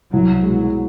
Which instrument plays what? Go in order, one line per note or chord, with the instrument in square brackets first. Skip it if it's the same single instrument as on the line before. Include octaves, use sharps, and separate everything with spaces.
[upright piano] C2 [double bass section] F#3
[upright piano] B2 G#3